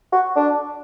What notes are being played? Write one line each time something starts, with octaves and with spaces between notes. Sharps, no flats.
F#4
D4